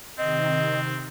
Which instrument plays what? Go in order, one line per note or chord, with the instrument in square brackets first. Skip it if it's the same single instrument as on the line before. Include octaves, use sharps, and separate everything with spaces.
[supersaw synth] C3 D#3 [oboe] C4 [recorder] D#5